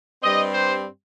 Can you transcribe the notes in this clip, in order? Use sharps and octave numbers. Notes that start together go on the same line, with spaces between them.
G2 G3 C4 D#5
C5